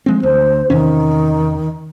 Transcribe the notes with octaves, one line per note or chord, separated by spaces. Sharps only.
F3 G#3 C4
D2 C5
E2 C3 D#3 C#4